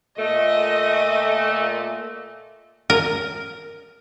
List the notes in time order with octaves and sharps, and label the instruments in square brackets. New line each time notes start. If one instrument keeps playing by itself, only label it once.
[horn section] A#2 A3 [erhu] D#5
[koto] A#4